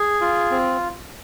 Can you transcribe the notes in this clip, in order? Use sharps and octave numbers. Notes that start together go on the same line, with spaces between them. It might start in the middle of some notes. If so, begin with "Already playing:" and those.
Already playing: G#4
F4
C4